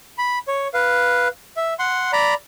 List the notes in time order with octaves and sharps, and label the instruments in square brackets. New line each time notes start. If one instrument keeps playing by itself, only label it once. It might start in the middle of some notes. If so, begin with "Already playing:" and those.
[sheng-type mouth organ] B5
C#5
B4 F5
E5
F#5 C6
D5 A#5 B5